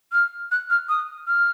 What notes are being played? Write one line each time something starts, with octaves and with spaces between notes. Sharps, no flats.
F6
F#6
F6
D#6
F6